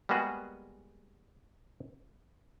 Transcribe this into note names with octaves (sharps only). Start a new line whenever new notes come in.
G3 G#3 A#3 B3 F#4 G#4